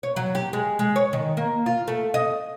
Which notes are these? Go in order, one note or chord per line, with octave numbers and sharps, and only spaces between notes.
C#5
F#3
G4
G#3
G#3
C#5
D#3
A#3
F4
A3
D#5